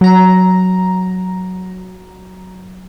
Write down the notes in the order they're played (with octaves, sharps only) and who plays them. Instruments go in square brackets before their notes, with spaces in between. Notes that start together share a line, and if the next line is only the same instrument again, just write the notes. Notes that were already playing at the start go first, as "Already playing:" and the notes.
[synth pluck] F#3 A#5